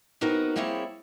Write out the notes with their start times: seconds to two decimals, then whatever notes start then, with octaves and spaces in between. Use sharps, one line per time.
0.21 B3 C4 D#4 F#4 A#4 B4
0.56 G3 A#3 C4 E4 G#4 C#5